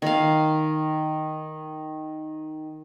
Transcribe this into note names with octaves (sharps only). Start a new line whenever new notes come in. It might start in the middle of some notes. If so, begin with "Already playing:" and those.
D#3 F5